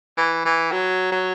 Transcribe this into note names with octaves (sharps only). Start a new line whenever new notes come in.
E3
E3
F#3
F#3